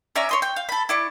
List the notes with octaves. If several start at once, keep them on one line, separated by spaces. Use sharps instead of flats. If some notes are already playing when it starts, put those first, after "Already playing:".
C#4 D5 E5 A#5
C#5 C6 D#6
G5
F5
A4 B5
E4 D5 C#6